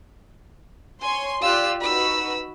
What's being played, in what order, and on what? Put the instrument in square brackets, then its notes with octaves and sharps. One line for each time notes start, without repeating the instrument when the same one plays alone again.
[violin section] C#5 C6 [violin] G#5
[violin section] F4 G4 D5 [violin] E6 F#6
[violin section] D#4 F#4 B4 [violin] B5 E6